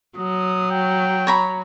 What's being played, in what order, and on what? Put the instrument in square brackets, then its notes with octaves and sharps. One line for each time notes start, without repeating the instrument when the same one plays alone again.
[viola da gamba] F#3 [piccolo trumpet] D#6
[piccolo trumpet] G5
[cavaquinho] C#5 A#5 B5